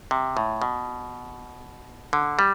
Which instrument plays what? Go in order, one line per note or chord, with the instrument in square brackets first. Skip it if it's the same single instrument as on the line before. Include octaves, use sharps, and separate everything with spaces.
[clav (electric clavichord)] C3
A2
B2
D3
G3